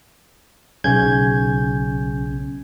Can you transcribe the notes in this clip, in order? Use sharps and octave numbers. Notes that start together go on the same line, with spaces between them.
B1 C#3 C#4 G6 G#6